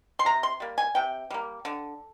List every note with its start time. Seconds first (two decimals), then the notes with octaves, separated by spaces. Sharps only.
0.19 C6
0.25 C3 A#5
0.43 C6
0.60 G3 A#3
0.78 G#5
0.95 C3 G5
1.30 G3 A#3
1.65 D3